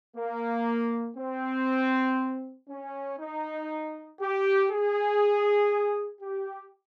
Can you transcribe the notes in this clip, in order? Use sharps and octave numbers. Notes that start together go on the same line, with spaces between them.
A#3
C4
C#4
D#4
G4
G#4
G4